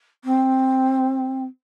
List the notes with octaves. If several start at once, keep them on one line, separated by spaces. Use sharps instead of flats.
C4